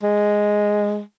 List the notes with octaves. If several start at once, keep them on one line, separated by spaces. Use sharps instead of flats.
G#3